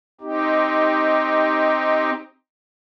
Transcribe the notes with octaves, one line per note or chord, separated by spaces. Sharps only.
C4 D#4 G4